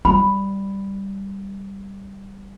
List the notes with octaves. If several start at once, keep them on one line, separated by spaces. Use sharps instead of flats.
G3 B5